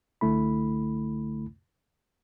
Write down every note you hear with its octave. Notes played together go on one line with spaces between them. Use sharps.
C2 D3 A3 E4 B5